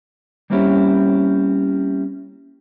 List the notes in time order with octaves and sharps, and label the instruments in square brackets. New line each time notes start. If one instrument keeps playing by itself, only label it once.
[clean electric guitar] G3 A#3 C4 C#4 E4 G4